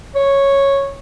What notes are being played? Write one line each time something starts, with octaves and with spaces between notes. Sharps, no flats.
C#5